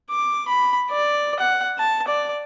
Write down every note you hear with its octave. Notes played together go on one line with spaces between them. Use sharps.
D6
B5
D5
F#5
A5
D5